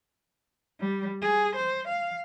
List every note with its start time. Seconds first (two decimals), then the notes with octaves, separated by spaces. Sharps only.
0.80 G3
1.22 G#4
1.55 C5
1.87 F5